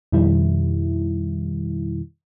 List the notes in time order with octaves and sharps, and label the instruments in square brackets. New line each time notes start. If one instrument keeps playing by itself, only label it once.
[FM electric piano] F2 B2 D#3 G3 E4